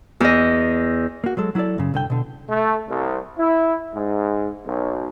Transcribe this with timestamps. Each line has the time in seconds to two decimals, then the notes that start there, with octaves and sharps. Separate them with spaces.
0.20 E2 D#5
1.24 A#3 F#4
1.37 F#3 G#3 A4
1.55 F#3 E4 G#4 A4 D5
1.78 F#2 C#3
1.94 C2 D3 G5
2.10 B2 D3
2.49 A3
2.89 C2
3.38 E4
3.94 G#2
4.66 B1